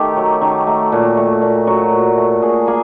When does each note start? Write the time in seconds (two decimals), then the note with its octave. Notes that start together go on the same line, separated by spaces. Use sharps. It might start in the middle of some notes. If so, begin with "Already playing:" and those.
Already playing: D#3 A3 G4
0.17 F#3
0.41 D#3
0.67 A3
0.92 A#2
1.17 A3
1.42 A#2
1.67 F#3 F#4
1.92 A#2
2.18 A3
2.42 A#2 G#4
2.67 A#3 G#4